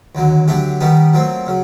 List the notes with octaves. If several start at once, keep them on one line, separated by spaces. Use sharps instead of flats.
D#2 D3 F#3
D3 F#3 A3 D4 G4
D#3 G3 B3 D#4 G4
A#2 F#3 A3 C4
C#3 F#3